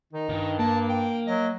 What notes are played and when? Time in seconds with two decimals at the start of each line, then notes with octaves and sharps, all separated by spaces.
0.13 D#3 D#4
0.29 G2 D#3
0.59 A#3 A5
0.89 G5
1.27 F#3 D#5